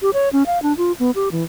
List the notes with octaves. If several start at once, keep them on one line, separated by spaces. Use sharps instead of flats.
G4
C#5
C#4
F5
D4
F4
B3
G4
E3